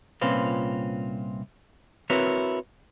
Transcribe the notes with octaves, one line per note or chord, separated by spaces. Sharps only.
C2 A#2 C4 C#4 F4 B4
C4 E4 F#4 A#4 B4 C#5